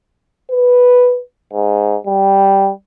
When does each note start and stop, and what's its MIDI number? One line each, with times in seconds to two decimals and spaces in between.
0.51 1.19 71
1.53 1.96 44
2.07 2.71 55